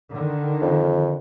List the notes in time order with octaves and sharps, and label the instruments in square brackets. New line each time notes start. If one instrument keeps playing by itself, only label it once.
[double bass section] D3 D#3
[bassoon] F2